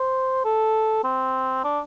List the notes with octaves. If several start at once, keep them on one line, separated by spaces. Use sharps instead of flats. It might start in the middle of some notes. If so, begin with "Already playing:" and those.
Already playing: C5
A4
C4
D4